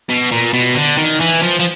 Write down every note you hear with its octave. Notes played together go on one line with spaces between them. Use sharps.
B2
A#2
B2
D3
D#3
E3
F3
F3